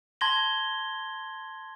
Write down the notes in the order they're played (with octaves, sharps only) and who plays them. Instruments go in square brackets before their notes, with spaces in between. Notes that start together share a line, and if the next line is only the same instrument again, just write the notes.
[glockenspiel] A5 C6 G#6 A#6 G7